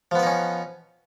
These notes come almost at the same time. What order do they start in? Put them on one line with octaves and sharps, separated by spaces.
F3 B3 B4 D#4 C#4